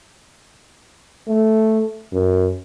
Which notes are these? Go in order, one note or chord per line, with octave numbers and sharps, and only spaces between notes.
A3
F#2